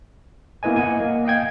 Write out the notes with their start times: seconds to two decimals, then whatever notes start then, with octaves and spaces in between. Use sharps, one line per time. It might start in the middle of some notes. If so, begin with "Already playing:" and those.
0.63 A#3 B3 E4 B4 D#5 G#5
0.76 D#5 F#5 G#5
1.00 A#3
1.25 D#5 F5 G5 G#6